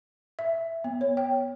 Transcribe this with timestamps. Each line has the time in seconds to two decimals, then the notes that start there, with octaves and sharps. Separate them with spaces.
0.39 E5
0.84 B3
1.01 C#5
1.17 G5